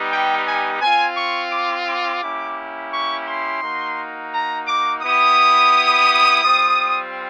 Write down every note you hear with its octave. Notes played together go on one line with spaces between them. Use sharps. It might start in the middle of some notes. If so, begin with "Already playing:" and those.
Already playing: G3 B3 D#4 G4
G5
G#5
C4 F4 G#5
C#6
D6
D6
A#3 C#4 E4 G4
C#6
C6
A#3 D#4 F#4
A#5
D6
B3 E4 G4 D#6
G3 C4 F4